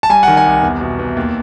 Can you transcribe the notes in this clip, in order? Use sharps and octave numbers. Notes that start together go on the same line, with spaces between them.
A5
G3 G#5
D#3 F#5
G#5
C2
E2
B2
E2
D#2